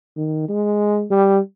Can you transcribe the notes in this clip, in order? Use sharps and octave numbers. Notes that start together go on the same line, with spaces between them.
D#3
G#3
G3